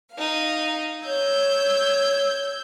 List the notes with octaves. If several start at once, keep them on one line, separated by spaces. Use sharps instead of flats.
D#4 F5
C#5 E6 G6 G#6